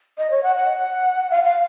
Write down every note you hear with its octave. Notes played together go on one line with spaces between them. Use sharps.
D#5
C#5
F#5
F#5
F5
F5